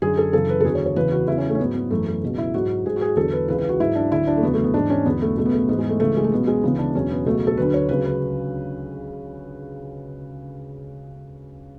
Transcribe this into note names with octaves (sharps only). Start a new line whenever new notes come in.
F#2 D3 F#3 G#4
A4
F#2 C#3 E3 A4
B4
A4
E2 D3 F#3 G#4
C#5
C#5
E2 C#3 E3 B4
F#4
E2 C#3 F#3 E4
C#4
A3
C#4
G#2 F#3 B3
B3
F#2 E3 A3
A3
C#2 B2 F#3
E4
G#2 F#3 F#4
G#2 F#3 G#4
F#4
G#4
E2 D3 F#3 A4
B4
C#2 C#3 E3 B4
B4
F#4
G#2 F#3 E4
D4
D2 D3 F#3 E4
D4
A3
E2 C#3 F#3 B3
A3
B3
G#2 E3 D4
C#4
E2 D3 F#3 B3
A3
C#2 B2 F#3 A3
B3
A3
G#2 E3 B3
G#3
A3
C#2 C#3 E3 A3
G#3
A3
C#2 B2 F#3 B3
G#3
D2 C#3 E3 B3
D4
E2 B2 F#3 C#4
B3
C#2 B2 F#3 A3
A4
D2 D3 F#3 B4
C#5
C#2 C#3 F#3 B4
B4